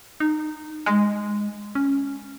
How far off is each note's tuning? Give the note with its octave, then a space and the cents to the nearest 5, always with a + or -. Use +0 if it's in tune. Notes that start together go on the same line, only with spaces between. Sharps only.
D#4 -20
G#3 -5
C#4 +0